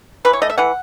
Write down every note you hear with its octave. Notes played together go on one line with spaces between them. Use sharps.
E3 B4
C#5
A3 D#5
E5
E3 F#5